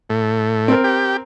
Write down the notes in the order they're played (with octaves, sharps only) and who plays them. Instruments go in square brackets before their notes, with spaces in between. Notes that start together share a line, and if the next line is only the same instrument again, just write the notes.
[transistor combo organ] A2
[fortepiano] C4 A#4
[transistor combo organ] G4